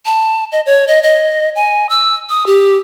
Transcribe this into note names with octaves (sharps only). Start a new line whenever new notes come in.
A5
D#5
C#5
D#5
D#5
G#5
E6
D#6
G4